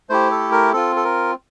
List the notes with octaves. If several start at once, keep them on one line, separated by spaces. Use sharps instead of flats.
A3 E4 G4 C5
A4
A#4
C4 F4 A4
A4
A#4